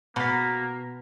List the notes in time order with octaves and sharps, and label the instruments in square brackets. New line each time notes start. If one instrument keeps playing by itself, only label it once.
[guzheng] B2 [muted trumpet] A#3 [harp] A#5 A6 B6